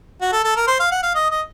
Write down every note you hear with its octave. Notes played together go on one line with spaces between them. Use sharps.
F#4
A4
A4
A#4
C5
F5
F#5
F5
D#5
D#5